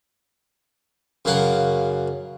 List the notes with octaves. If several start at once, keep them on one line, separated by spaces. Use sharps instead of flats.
F#2 C#3 A#3 F5 F#5